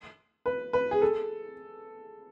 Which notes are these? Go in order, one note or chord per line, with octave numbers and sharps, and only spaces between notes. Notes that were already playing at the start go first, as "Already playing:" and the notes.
B4
B4
G#4
A4